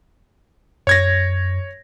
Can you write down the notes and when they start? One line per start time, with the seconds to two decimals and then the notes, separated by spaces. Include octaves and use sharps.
0.87 F#2 C#5 G#6 A#6